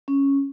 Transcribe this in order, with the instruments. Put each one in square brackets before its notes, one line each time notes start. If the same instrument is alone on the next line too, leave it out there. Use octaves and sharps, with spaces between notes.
[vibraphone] C#4